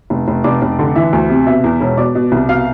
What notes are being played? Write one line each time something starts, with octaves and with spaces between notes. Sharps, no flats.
F1
F1
F1 D5
F1
D3
E3 E5
D2
C3
B2 E5
E2
E1
B2 D5
B2
C2
B2 F5